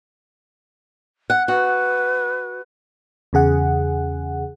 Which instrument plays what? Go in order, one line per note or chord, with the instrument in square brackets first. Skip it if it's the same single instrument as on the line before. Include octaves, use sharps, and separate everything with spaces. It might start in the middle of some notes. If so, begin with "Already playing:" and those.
[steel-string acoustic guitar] F#5
[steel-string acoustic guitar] F#4 [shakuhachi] B4
[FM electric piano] E2 C#3 G#4 F#5